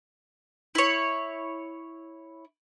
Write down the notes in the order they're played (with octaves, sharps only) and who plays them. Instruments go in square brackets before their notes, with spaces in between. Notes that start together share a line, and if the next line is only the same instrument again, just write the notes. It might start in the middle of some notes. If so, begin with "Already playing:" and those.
[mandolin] E4 C#5